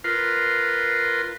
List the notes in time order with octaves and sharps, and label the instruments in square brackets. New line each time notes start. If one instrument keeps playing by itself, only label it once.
[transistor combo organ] F4 A#4 B4 C6